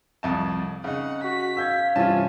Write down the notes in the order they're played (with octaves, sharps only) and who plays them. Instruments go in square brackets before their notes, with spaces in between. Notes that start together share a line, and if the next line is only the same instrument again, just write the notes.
[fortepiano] C2 F2 A5
[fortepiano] C#3 D#4 [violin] F#5
[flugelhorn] F#4 [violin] B6
[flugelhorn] F5 [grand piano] E6 G6 G#6
[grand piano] G2 C3 E3 [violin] C#4 [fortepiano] F4 A5